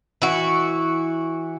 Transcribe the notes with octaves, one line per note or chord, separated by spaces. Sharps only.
E3 F#4